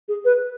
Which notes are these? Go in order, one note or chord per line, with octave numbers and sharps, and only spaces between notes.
G#4
B4